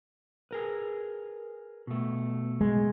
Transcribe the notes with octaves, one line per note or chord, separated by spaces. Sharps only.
G#4 A#4 B4
B2 A3
G#3